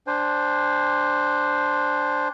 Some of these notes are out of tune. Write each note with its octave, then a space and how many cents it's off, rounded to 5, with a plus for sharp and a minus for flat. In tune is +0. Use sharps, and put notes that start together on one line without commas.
D4 +0 C5 +0 G#5 -40